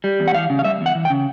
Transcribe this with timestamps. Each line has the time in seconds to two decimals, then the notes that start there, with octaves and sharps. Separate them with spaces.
0.04 G3
0.20 E2
0.28 F#5
0.34 E3 F5
0.50 C#3
0.59 F5
0.64 G3 E5
0.81 E2
0.86 F#5
0.95 E3
1.05 G5
1.10 C#3